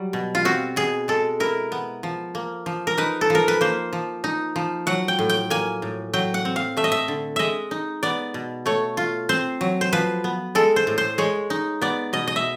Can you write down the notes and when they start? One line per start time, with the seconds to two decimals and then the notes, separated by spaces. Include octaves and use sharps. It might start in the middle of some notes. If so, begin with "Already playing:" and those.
Already playing: F#3 G3
0.13 B2
0.35 F4
0.45 C4 F#4
0.76 B2 G#4
1.08 G#3 A4
1.40 E4 A#4
1.72 B3
2.03 F3
2.35 A#3
2.66 F3
2.87 A#4
2.97 D#4 B4
3.21 A4
3.30 F3 A#4
3.48 B4
3.61 A#3 C5
3.93 F3
4.24 D#4
4.56 F3
4.87 F#3 F#5
5.08 G5
5.19 A2
5.29 G5
5.50 A#3 G#5
5.82 A2
6.13 F#3 G5
6.34 F#5
6.45 C4
6.56 F5
6.77 A3 E5
6.84 D#5
6.92 E5
7.08 D3
7.36 G#3 D#5 E5
7.71 D#4
8.03 B3 D5
8.34 B2
8.66 A3 C#5
8.97 F4
9.29 C4 C5
9.61 F#3
9.81 C5
9.92 F3 B4
10.24 B3
10.55 G#3 A4
10.76 C5
10.87 A2
10.98 C5
11.18 G#3 C#5
11.50 D#4
11.82 B3 D5
12.13 B2 D#5
12.27 D#5
12.36 E5